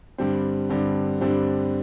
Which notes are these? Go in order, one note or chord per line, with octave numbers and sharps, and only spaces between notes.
G2 D3 G3 C4
G2 D3 G3 C4
G2 D3 G3 C4